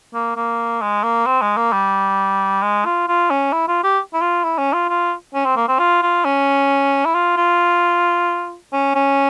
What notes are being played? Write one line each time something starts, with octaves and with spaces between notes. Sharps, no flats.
A#3
A#3
G#3
A#3
C4
G#3
A#3
G3
G#3
F4
F4
C#4
E4
F4
G4
E4
F4
E4
C#4
F4
F4
C#4
C4
A#3
C4
F4
F4
C#4
E4
F4
F4
C#4
C#4